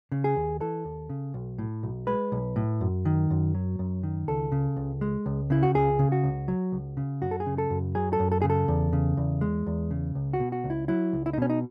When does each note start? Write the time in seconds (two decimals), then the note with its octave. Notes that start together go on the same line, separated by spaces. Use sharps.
0.12 C#3
0.24 G#4
0.36 D#2
0.60 E3 A4
0.85 D#2
1.09 C#3
1.34 B1
1.58 A2
1.83 B1
2.07 G#3 B4
2.32 B1
2.56 A2
2.81 F#2
3.05 D#3
3.30 F#2
3.55 F#3
3.79 F#2
4.03 D#3
4.28 C#2 A4
4.52 C#3
4.77 C#2
5.01 G#3
5.26 C#2
5.50 C#3 E4
5.63 F#4
5.75 C#2 G#4
5.99 C#3
6.12 F#4
6.24 C#2
6.48 F#3
6.72 C#2
6.97 C#3
7.22 F#2 F#4
7.31 A4
7.40 G#4
7.46 C#3
7.58 A4
7.70 F#2
7.95 F#3 G#4
8.13 A4
8.20 F#2
8.32 A4
8.42 C#3 G#4
8.50 A4
8.68 E2
8.93 C#3
9.17 E2
9.41 G#3
9.67 E2
9.91 C#3
10.15 C#2
10.33 F#4
10.40 B2
10.52 F#4
10.64 C#2
10.70 E4
10.88 F#3 E4
11.13 C#2
11.26 E4
11.33 D#4
11.38 B2 C#4
11.50 D#4